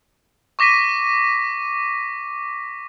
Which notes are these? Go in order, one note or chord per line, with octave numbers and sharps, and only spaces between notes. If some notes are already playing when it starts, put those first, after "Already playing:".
C#6 D6 A#6 B6 D#7